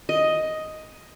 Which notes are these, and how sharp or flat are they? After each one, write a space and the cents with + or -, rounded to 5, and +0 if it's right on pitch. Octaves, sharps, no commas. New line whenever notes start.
D#5 +5